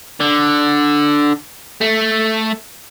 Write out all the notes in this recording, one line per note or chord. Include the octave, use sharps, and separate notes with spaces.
D3
A3